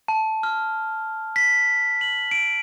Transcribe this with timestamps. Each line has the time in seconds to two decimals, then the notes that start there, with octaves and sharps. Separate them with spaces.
0.08 A5
0.43 F6
1.36 B6
2.01 F#7
2.31 D7